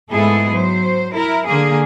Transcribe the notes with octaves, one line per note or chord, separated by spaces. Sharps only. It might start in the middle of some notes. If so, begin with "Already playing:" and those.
G#2 A3 B3 E4 G#4 A4
F#3 C5
E4 A#4
D3 A#3 G#4